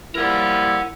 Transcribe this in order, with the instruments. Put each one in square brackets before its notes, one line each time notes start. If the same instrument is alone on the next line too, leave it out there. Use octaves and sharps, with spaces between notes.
[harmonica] F3 G3 A#3 [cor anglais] E4 [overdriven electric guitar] A#4 F#5